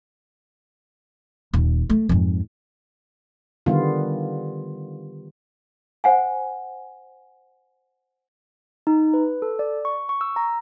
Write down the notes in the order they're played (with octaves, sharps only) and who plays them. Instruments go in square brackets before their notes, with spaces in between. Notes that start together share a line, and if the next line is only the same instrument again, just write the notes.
[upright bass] D#1
A3
F2 G#2
[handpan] D3 D#3 G3 B3 F4
[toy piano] C5 F#5 G#5
[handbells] D#4
B4
A4
D5
C#6
C#6
E6
A#5